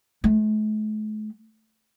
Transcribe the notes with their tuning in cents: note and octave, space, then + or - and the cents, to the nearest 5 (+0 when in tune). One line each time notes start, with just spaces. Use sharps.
A3 -45